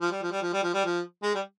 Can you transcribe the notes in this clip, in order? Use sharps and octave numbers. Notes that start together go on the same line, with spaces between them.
F3
G3
F3
G3
F3
G3
F3
G3
F3
G#3
G3